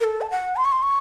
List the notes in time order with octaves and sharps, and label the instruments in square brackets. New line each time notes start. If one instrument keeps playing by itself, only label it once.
[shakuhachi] A#4
A4
A5
F#5
C6
C#6
C6
C#6